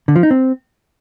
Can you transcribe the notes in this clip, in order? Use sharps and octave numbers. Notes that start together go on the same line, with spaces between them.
D3
F3
D#4
C4